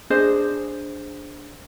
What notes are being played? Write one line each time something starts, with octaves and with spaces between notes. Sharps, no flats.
D4 G#4 C5 D#5